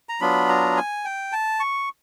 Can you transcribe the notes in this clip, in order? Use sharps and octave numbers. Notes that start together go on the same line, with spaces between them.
A#5
F#3 B3 D4 F4 B5
A#5
G#5
G5
A5
C#6